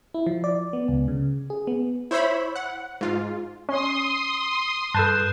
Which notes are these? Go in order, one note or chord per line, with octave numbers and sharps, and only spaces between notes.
E4
F3
D5
B3
C#2
C#3
G#4
B3
E4 C5 C#5 E5 B5
F#5
G#2 F4
C#4 C6 D#6
G2 A4 B4 A5 F#6 G6 E7